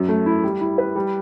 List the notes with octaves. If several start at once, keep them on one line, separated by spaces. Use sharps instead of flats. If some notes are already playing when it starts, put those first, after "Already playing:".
Already playing: F#2
A3
E4
G3
E4
B4
G3